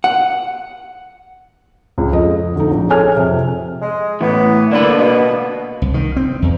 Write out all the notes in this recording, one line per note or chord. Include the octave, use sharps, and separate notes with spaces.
F#5
C#2
F2 D#5
D2 D#4
A#1
G#4 A4 C#5 G#5 F6
F2 C3
G#3
A2 E3 B3
D3 A#3 D4 B4
B2
C2
D#3
C4
E2